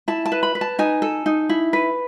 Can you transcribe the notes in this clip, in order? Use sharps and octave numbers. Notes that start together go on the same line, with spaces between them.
E4 A5
A5
B4
B5
B4
A5
D#4 G#5
A4
D#4
E4
B4